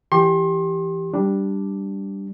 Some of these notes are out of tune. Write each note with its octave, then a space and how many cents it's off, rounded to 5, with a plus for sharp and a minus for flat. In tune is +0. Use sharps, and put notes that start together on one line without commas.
E3 +15 G4 +0 C6 +30
G3 +0 D4 +0